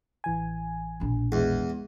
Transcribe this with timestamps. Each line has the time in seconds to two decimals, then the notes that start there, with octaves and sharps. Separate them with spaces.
0.24 A1 E3 G#5
1.00 A#1 B2
1.32 E2 G#3